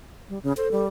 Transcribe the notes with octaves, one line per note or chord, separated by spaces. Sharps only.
G3
C#3
A4 C5
G3